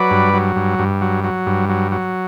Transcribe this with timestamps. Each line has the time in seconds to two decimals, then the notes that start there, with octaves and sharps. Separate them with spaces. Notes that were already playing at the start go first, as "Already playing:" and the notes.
Already playing: F#3 B4 D5
0.11 G2
0.34 F#3
0.56 G2
0.79 G2
1.01 F#3
1.24 F#3
1.46 G2
1.69 F#3
1.92 F#3